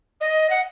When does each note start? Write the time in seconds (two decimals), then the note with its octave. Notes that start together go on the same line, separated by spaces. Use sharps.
0.20 D#5
0.49 F#5